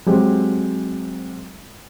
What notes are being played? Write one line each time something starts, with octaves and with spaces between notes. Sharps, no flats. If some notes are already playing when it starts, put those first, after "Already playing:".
F#3 G#3 C4 G4